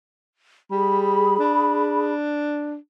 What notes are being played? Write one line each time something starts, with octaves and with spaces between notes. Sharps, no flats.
G3 G#4 B5
D4